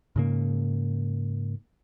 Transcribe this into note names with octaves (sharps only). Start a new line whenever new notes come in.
G#2 C#3 A#3